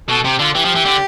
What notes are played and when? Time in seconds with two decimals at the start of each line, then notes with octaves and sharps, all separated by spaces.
0.08 B2 A4
0.24 C3 G4
0.39 D3 F4
0.55 E3 G4
0.65 F3
0.76 E3
0.86 D3